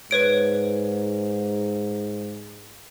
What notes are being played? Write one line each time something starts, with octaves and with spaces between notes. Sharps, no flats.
G#2 B4 C#5 D7